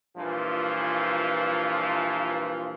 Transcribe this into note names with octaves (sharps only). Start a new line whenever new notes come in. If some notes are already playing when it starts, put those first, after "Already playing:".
G2 A#2 E3 F3